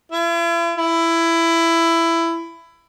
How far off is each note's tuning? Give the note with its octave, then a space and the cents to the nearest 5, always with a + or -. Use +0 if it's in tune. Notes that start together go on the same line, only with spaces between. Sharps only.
E4 +45
E4 +15